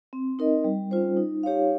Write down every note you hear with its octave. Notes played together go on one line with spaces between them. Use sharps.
C4
D#4 A#4 D#5
G3
C#4 F4 C5
D#4
G4 C#5 F5